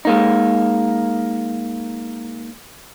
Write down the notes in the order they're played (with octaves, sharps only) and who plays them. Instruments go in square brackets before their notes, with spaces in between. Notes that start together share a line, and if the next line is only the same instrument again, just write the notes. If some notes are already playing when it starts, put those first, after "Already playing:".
[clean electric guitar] G#3 A#3 D#4